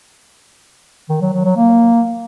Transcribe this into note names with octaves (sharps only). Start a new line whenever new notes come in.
D#3
F#3
F#3
F#3
A#3